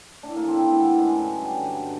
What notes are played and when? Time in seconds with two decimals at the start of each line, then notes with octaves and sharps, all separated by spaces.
0.23 A2 D4
0.36 A#3
0.42 E3
0.48 C4
0.61 A2 B3
0.80 E3
0.98 F#2 G#3
1.17 D3 F#3
1.36 F#2 G3
1.54 D3 F#3
1.73 G2